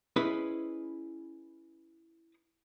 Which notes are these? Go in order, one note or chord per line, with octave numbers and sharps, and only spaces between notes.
C#4 E4 G#4 B4 C5 D#5